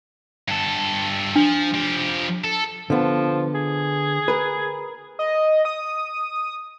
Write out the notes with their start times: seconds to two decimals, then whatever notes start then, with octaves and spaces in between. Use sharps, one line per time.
0.48 G2 A4
1.36 F3 D4
1.74 F3 G4
2.44 A4
2.90 D3 F3 B3
3.54 G#4
4.28 A#4 B4
5.19 D#5
5.65 D#6